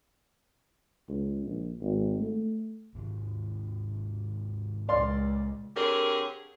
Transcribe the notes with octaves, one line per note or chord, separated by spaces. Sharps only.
C#2
A#1
G#1
A3
G#2 C3 D#3
C#2 A#2 D5 F5 C6
D3 C4 G4 G#4 A#4 C#5